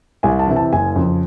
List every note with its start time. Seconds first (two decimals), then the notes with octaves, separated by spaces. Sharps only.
0.23 C2 G#5
0.39 A5
0.47 C3 E3
0.56 A5
0.73 F#1 G#5
0.96 F2 C#3